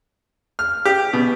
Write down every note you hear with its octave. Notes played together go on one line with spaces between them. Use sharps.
F6
G4
B2